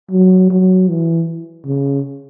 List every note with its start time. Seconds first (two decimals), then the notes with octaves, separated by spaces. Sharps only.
0.11 F#3
0.50 F#3
0.89 E3
1.67 C#3